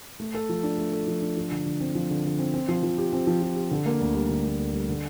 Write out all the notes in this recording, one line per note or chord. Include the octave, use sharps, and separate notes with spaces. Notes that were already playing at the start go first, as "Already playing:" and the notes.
A3
A4
F3
D4
A3
A4
F3
D4
F3
D3
D3
C4
F3
D3
D3
C4
C4
F3
F3
G4
C4
F3
F3
G4
D3
A#3
D2
G3
D3
A#3
D2
G3
D3